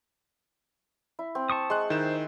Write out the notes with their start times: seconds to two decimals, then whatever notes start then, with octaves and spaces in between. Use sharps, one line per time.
1.19 E4
1.35 C4
1.50 A5 C#6 D#6
1.70 G#3 C6 F#6
1.90 D#3 E4 C5 E7